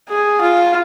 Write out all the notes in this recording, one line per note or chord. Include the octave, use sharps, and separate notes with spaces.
G#4
F4